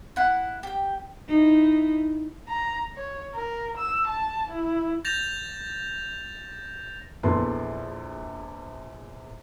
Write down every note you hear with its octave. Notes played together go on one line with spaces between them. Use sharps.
E4 F#5
G4 G5
D#4 E4
A#5
C#5
A#4
E6
A5
E4
G6 A6 A#6 E7 F7
A#1 E2 A4 B4 C6